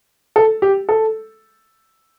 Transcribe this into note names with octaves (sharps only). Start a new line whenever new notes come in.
A4
G4
A4